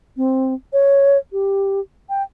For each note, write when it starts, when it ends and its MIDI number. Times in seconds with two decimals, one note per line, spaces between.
0.17 0.54 60
0.73 1.18 73
1.32 1.80 67
2.09 2.22 79